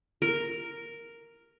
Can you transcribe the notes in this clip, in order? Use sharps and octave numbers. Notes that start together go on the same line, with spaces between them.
A#4